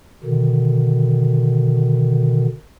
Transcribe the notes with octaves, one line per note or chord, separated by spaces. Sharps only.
B2 D3 D#3